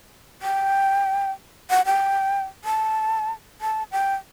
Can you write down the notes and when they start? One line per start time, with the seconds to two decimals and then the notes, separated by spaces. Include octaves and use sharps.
0.42 G5
1.70 F#5
1.86 G5
2.65 A5
3.61 A5
3.92 G5